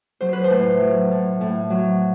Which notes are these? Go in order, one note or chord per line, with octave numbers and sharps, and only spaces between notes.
F#3 C5
B4
C5
A2
F#3
A2
A2
F#3